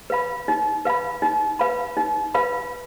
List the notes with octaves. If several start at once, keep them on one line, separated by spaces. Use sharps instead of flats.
B4 F5 B5
D#4
B4 F5 B5
D#4
B4 F5 B5
D#4
B4 F5 B5